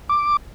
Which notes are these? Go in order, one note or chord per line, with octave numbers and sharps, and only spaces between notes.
D6